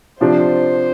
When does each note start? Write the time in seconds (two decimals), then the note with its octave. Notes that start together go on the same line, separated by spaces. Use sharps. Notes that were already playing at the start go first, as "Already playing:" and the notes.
0.20 C3 F3 D4 C5